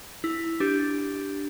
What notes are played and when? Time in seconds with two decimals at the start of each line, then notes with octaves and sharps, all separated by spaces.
0.24 E4
0.60 D4 G4